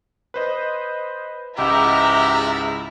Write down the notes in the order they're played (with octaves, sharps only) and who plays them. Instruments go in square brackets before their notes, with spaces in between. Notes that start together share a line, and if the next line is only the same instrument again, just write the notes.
[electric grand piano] B4 C5 D#5
[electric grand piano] C#2 D#5 F#5 [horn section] G#2 E4 [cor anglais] G4 [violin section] E5 A#5